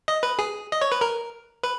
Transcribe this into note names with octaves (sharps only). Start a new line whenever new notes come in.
D#5
B4
G#4
D#5
C#5
B4
A#4
B4